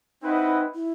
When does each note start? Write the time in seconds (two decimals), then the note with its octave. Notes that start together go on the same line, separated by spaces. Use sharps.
0.22 C4 D#4 E4 B4 D#5 F#5
0.75 E4